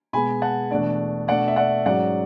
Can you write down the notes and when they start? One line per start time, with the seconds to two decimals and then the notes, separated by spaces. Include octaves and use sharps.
0.13 B2 G#3 B3 G#5 B5
0.42 F#5 A5
0.71 E2 B2 A3 D4 D5
1.28 B2 A3 D4 D5 F#5
1.48 E5
1.56 D5 F#5
1.85 G#2 F#3 C#4 D5 F#5